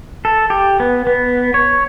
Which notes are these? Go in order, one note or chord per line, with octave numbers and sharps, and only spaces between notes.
A4
G4
B3
B3
C#5